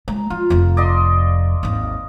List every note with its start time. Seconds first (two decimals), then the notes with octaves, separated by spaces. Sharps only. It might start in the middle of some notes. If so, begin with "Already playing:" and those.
0.08 G#3 A#5
0.30 F3 F4
0.50 F1 F2
0.77 D5 D#5 C6
1.63 G#1 D#2